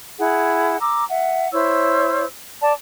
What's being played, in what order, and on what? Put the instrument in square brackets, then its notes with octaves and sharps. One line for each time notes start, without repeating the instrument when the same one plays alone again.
[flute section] E4 G#4 F#5
A#5 D6 E6
E5 F#5
E4 C5 C#5 E6
D5 A5